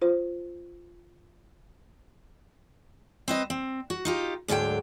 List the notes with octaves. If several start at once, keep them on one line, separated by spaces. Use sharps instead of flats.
F4 C5
C4 B4 D#5
C4
F#4
D#4 F4 G4
D2 G#2 D3 F#3 G5